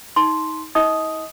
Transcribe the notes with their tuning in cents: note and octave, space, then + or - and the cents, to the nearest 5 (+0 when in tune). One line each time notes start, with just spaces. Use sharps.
D#4 +25 C6 +0
E4 -45 D#5 +25 D#6 +0